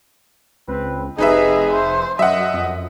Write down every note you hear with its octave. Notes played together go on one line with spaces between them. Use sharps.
C#2 C4 B4
F1 C3 D#4 G#4 B4 D#5 E5
C5
F#2 F#3 D#5 E5 F#5
F2